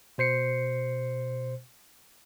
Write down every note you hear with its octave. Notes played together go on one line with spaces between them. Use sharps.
B2 C5 C7 C#7